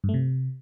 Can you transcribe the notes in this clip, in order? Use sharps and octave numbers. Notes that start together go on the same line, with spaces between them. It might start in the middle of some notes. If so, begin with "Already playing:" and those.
G2
A3
C3